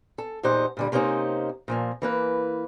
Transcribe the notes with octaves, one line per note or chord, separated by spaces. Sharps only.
A4
E2 A#2 D#4 G4 C5 F#5
A#2 D3 G3
C3 A#3 C4 C#4 D#4 C5
A#2 F3 A#3
E3 A#3 B4